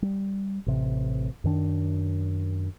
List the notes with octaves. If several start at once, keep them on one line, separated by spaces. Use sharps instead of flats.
G3
A1 C3
F#2 D#3 D4